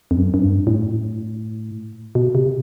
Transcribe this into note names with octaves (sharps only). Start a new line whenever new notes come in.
F2
F#2
F#2
G2
A2
B2
C3